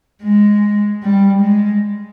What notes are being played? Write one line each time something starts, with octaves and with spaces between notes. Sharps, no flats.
G#3
G3
G#3